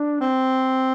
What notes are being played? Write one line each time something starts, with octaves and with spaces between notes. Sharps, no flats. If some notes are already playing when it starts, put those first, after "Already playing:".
Already playing: D4
C4